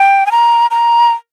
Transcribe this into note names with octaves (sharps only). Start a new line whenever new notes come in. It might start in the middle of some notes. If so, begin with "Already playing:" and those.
Already playing: G5
G#5
A#5
A#5